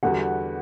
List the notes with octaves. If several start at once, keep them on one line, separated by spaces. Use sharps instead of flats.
E2 D3 G3 B3 F#4 F#5